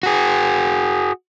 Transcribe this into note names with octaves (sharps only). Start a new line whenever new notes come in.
F#4 G#4